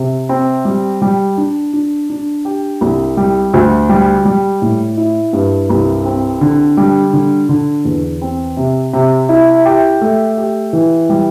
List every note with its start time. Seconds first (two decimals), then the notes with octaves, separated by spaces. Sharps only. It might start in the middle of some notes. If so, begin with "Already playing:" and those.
Already playing: C3
0.29 C4
0.65 G3
1.02 G3
1.38 D4
1.73 D4
2.10 D4
2.45 G4
2.81 C2
3.17 G3
3.54 D2
3.89 G3
4.25 G3
4.62 A2
4.97 E4
5.33 G2
5.70 C2
6.05 C4
6.41 D3
6.77 G3
7.13 D3
7.49 D3
7.85 E2
8.21 C4
8.57 C3
8.93 C3
9.29 E4
9.65 G4
10.01 A3
10.37 G4
10.73 E3
11.09 G3